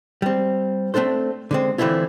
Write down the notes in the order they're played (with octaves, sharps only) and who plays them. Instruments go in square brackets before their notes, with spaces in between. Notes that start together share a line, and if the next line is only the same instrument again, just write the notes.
[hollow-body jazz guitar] G3 C4
A3 C4 D4 A4 C5
D3 G#3 C4
D3 E3 A3 C4 E4 F4